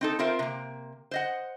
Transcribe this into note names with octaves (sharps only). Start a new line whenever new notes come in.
C4 D#4 A4
C4 F4 A#4 C5 E5
C3 A#3
C5 D#5 F#5